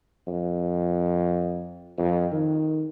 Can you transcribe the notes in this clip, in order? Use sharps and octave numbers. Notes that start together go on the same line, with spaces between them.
F2
F2
D#3